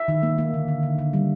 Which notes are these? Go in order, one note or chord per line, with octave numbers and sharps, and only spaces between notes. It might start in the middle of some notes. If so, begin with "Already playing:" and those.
Already playing: E5
D#3
A#3
A#3
D3
D3
D3
D3
G3